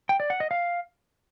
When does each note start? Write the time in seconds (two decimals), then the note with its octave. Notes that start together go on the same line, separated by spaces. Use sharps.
0.09 G5
0.20 D5
0.30 F#5
0.40 D#5
0.51 F5